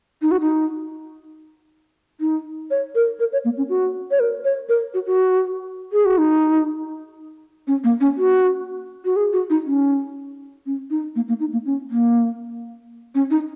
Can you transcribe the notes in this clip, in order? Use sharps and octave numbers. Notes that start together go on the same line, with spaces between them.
D#4
F#4
D#4
D#4
C#5
A#4
A#4
C#5
A#3
C#4
F#4
C#5
A#4
C#5
A#4
F#4
F#4
G#4
F#4
D#4
C#4
A#3
C#4
F#4
F#4
G#4
F#4
D#4
C#4
C#4
D#4
A#3
A#3
D#4
A#3
C#4
A#3
C#4
D#4